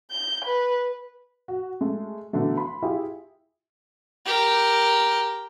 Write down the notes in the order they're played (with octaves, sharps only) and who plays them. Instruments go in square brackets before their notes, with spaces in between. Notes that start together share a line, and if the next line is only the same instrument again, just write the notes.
[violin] G6
B4
[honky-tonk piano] F#4
G#3 A3
B2 D3 E3 F#3 A3
B5 C6
E4 F4 G4 G#4
[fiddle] G4 A#4